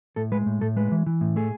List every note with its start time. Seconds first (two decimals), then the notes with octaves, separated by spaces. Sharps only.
0.16 A2 A4
0.32 G#3 B4
0.46 A2
0.61 A2 A4
0.76 G#3 B4
0.92 E3
1.06 E3
1.21 A2
1.36 A3 G#4